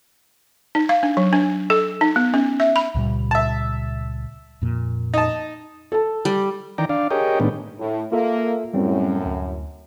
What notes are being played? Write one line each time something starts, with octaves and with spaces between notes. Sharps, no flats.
D#4
F5
D4
F#3
D4
A4
D#4
B3
C#4
E5
B5
C#2 A#2 G3
E5 A5
F2 A#2
D#4 A5
A4 A5
G3
D#3 E3 D5 G5 A#5
D4 D5 F5
G4 G#4 A#4 C#5 D#5 G5
A2 D#3 G#3 B3 D4
A2
A#3 F4 A4 E5
F#2 A2 G3 C4 C#4
D2